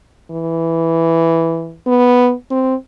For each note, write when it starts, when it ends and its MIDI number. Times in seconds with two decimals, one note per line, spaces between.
0.31 1.75 52
1.87 2.33 59
2.51 2.75 60